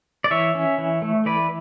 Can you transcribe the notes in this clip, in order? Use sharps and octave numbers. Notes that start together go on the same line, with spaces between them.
D5
E3 C#5 E5
C#4
E3
A3
E3 B4 D5